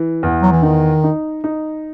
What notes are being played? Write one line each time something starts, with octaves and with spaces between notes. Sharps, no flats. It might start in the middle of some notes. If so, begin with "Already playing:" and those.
Already playing: E3
E2
F#3
E3
D#3 D#4
D#4
D#4